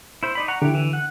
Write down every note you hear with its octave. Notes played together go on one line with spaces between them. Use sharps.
E4 C5
D#4 D5 B5
F#5 A#5 C#6
D3 E4 G4
E3
F#5